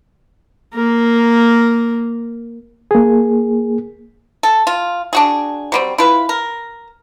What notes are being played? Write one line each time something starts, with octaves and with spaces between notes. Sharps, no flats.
A#3 A#4
A#3 G#4
A4
F4
D4 F#4 G#4
F#3 G3 C4
E4 F4 B4
A#4